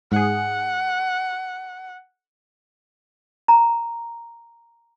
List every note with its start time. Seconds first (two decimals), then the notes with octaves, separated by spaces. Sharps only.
0.12 G#2 G#4 F#5
3.48 A#5